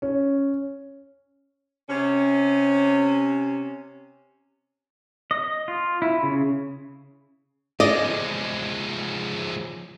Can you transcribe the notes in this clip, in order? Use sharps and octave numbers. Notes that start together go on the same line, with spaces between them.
C#4
C3 C#4
D#5
F4
E4
C#3
F3 G#3 D5 D#5